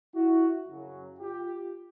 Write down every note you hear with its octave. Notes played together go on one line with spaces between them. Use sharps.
E4 F#4
F#2 C#3 F#3
F4 G4